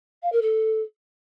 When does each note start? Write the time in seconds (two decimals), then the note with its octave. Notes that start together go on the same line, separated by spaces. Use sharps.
0.22 F5
0.32 A#4
0.42 A4